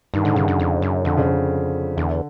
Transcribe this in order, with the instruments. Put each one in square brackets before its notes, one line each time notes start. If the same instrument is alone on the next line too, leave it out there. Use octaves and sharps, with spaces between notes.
[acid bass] G2 [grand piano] D#3
[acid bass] G#2 [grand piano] D3
[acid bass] G2 [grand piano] C#3
[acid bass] F#2 [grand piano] D3
[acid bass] F2
F#2
[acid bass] F2 [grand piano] D3
[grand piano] C#3
D3
[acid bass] E2 [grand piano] D3